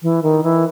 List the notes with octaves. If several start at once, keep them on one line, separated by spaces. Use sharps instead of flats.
E3
D#3
E3